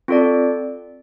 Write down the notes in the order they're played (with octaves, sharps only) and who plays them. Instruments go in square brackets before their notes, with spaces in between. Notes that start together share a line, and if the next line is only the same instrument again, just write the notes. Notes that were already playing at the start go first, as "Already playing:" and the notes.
[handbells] C4 F4 A4 D5